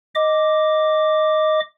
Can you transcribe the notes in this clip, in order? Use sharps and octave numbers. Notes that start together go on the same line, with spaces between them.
D#5 D6